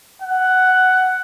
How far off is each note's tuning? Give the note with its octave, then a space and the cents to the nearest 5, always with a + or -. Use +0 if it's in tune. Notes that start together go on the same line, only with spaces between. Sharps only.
F#5 +10